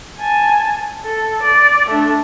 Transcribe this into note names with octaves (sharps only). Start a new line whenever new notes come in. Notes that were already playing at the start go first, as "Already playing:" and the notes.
G#5 A5
A4
D5
A3 D4